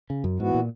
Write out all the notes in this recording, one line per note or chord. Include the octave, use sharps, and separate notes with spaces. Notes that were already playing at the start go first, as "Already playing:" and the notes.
C#3
F#2
G#2 E3 B3 F#4
A#2